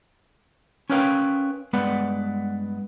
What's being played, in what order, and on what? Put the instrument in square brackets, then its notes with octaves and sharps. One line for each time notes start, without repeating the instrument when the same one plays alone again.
[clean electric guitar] C#4 A#4 B4 C#5 F5 G5
G2 G#3 B3 B4 D5 F#5